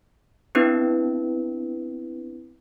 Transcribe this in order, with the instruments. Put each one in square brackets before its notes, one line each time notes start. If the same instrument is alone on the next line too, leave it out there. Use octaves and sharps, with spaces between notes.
[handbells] B3 C4 D4 E4 B4